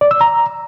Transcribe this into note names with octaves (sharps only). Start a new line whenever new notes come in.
D5
E6
A#5